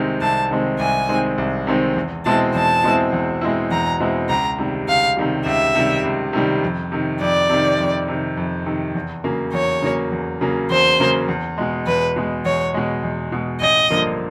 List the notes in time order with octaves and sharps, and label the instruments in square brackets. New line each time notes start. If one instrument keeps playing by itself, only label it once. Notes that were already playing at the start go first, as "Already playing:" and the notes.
Already playing: [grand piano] C2 C3 D#3 G#3 C4
[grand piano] C2 [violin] A5
[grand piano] C3 D#3 G#3 C4
[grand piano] C2 [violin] G#5
[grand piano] C3 D#3 G#3 C4
C2
C3 D#3 G#3 C4
E2
[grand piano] B2 G#3 C4 E4 [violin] A5
[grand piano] E2 [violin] A5
[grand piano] B2 G#3 C4 E4
E2
B2 G#3 C4 E4
[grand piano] E2 [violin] A#5
[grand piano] B2 G#3 C4 E4
[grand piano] C#2 [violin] A#5
[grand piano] C3 D#3 G3
[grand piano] C#2 [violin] F5
[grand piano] C3 D#3 G3
[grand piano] C#2 [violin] E5
[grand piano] C3 D#3 G3
C#2
C3 D#3 G3
F2
C3 D#3
[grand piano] F2 [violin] D5
[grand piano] C3 D#3
F2
C3 D#3
F2
C3 D#3
E2
C#3 F#3 A#3
[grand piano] E2 [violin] C#5
[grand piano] C#3 F#3 A#3
E2
C#3 F#3 A#3
[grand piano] E2 [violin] C5
[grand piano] C#3 F#3 A#3
E2
B2 G#3
[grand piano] E2 [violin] B4
[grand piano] B2 G#3
[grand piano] E2 [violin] C#5
[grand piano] B2 G#3
E2
B2 G#3
[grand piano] A1 [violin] D#5
[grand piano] G2 D3 F3 A#3